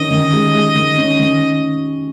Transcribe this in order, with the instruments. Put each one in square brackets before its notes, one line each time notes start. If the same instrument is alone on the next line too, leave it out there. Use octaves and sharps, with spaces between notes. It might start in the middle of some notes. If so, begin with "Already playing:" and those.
Already playing: [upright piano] D#3 C#4 [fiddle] D#5
[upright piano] D#3
G#3
G#3
D#3
C#4
D#3